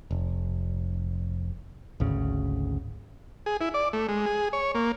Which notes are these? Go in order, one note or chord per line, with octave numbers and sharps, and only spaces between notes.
F1
G#1 D2 C#3
G#4
E4
D5
A3
G#3
G#4
C#5
A#3